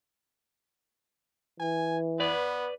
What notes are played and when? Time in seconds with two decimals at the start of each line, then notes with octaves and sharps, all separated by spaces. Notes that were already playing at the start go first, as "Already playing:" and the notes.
1.60 E3 G#5
2.20 B3 B4 D5